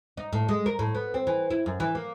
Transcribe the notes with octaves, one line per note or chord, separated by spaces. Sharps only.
D#4
A2
G#3
A#4
A2
B3
C4
E3
E4
F#2
E3
A#3